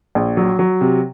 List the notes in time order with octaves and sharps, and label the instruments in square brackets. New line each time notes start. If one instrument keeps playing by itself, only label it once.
[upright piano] A#1
F#3
F#3
C3